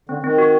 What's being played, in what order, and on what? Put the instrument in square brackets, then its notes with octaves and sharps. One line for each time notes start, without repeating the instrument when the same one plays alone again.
[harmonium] D3 [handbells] C4
[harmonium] D#3 [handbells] C4
[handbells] F#4